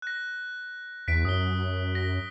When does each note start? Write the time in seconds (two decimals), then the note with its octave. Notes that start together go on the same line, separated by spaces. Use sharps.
0.02 F#6 A#6
1.08 E2 B6 D7
1.25 F#2 D#6 G7
1.95 A#6